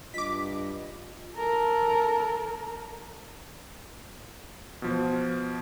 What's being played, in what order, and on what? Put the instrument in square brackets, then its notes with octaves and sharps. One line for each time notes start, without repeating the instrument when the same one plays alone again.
[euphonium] G2 [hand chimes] F4 [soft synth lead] D#5 [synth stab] D6 B6
[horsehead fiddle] A4 A#4
[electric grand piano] B2 F3